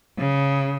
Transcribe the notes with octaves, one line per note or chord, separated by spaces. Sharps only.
C#3